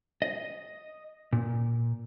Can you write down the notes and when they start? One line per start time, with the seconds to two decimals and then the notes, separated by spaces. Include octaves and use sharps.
0.22 D#5
1.33 A#2